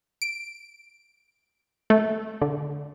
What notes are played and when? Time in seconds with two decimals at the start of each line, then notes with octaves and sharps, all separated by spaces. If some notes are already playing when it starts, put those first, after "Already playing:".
0.22 D7
1.90 A3
2.42 D3